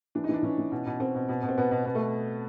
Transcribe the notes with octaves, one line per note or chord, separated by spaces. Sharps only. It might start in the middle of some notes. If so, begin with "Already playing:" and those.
E3 D4
D#4
E3
D4
E3 C#4
E3
B2
B2
B2 C4
B2
B2
B2
C4
B2 B3
B2
B2 B3
A3